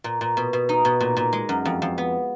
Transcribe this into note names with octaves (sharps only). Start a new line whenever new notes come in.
A#2
A#2
B2
B2
D#4
B2
A#2
A#2
G#3
F#2
F2
F2
B3